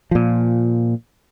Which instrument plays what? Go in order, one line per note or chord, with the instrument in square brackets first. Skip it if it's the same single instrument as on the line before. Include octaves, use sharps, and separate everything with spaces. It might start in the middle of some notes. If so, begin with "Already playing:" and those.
[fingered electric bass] A#2 F3